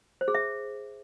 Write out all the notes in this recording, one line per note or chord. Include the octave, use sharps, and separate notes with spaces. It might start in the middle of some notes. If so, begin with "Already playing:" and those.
C5
G#4
E5